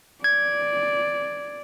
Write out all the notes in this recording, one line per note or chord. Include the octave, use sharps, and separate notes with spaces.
D5 G#6